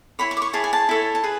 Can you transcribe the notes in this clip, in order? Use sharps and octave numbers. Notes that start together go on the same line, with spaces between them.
E4 G#4 C#5 B5
C#6
D6
C#6
E4 G#4 C#5 A5
G#5
A5
E4 A4 C#5
A5
G#4 B4